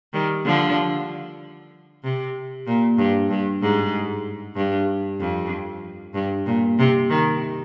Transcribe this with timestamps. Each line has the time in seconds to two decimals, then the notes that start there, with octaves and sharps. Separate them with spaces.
0.13 D#3 G3
0.45 D3 F3
2.04 C3
2.67 A#2
2.98 G2
3.30 G2
3.61 G#2
4.56 G2
5.20 F2
6.14 G2
6.46 A#2
6.79 C3
7.10 D#3